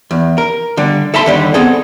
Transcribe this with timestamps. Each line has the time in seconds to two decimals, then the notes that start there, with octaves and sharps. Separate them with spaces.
0.11 E2
0.38 A#4
0.77 D3 G3
1.14 A4 E5 A5 B5 C6
1.26 D#2 D3 G3
1.54 B3 C4 G#4 A4